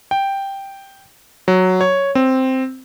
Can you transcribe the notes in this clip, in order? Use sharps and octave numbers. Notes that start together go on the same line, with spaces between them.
G5
F#3
C#5
C4